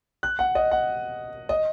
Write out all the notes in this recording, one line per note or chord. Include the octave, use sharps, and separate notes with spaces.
F#6
F#5
D#5
F#5
D#5